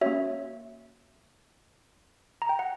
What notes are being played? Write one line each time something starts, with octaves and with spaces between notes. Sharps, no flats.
A#3 C#4 F#4 C#5 E5
A#5
G5
F#5